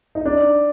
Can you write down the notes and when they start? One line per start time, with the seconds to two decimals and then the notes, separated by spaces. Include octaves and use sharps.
0.15 D#4
0.25 D4